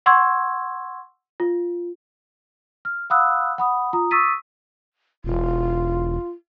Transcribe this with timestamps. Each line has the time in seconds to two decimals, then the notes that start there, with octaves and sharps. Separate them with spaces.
0.06 F#5 C6 C#6 E6 G#6
1.40 F4
2.85 F6
3.10 F5 F#5 B5 D#6 E6 F#6
3.58 F#5 B5 D#6
3.93 F4 A#5 D#6
4.11 C#6 D#6 E6 A6 B6 D#7
5.24 E1 F4